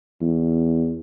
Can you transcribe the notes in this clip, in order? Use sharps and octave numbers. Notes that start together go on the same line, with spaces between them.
E2